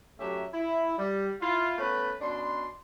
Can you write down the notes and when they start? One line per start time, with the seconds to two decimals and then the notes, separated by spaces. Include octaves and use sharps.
0.19 F#3 A3 C#4 G4 E5
0.54 E4
0.97 G3
1.41 E4 F4
1.78 A3 B3 C#4 B4
2.20 B2 C#4 D4 B5 C6